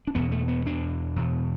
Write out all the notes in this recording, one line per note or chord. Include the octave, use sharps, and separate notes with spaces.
D4
E2 B2 B3
A3
B3
E2 B2 D4
E2 B2